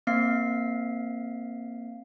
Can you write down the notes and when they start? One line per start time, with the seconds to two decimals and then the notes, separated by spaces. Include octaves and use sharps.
0.07 A#3 C4 F5 C7